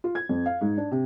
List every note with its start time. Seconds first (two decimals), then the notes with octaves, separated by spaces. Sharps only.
0.04 F4
0.15 G#6
0.29 F2
0.46 F5
0.61 G#2
0.77 D4
0.91 C3